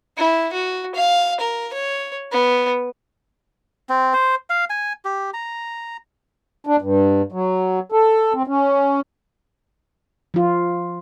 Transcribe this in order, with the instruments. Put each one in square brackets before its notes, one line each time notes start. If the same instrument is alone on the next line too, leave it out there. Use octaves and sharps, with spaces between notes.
[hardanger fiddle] E4
F#4
F5
A#4
C#5
B3
[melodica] C4
C5
F5
G#5
G4
A#5
[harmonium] D4
G2
F#3
A4
C4
C#4
[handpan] F3 F4